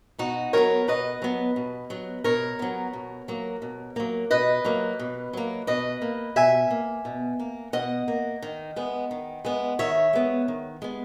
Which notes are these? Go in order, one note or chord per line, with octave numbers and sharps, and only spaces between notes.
B2 D#4 F#4
F#3 B3 A#4 C#5
B2 B4 D#5
F#3 B3
B2
F#3 B3
B2 A#4 C#5
F#3 B3
B2
F#3 A#3
B2
F#3 A#3
B2 B4 D#5
F#3 A#3
B2
F#3 A#3
B2 B4 D#5
A#3
B2 E5 G#5
A#3
B2
A#3
B2 D#5 F#5
A#3
D#3
G#3 B3
D#3
G#3 B3
D#3 C#5 E5
G#3 B3
D#3
G#3 B3